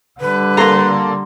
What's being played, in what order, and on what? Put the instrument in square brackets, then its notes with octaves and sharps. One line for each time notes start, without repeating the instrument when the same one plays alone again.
[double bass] D3 G3 [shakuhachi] B4
[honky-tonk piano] A#3 A4 [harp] A#5 C6